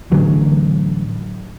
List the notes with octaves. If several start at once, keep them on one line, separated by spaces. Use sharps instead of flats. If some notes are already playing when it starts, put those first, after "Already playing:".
A1 D3 F#3